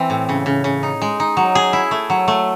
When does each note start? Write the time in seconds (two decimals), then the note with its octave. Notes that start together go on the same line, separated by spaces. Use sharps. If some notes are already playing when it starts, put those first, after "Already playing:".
Already playing: E3 C4
0.10 A2
0.29 C#3
0.46 C#3
0.64 C#3
0.83 D#4
1.02 G#3
1.20 D#4
1.37 F#3
1.55 G#4
1.73 E4
1.91 A3
2.10 F#3
2.28 A3